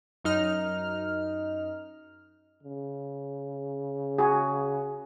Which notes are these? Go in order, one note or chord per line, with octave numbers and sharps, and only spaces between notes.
F#2 D#4 F6
C#3
F#4 G#4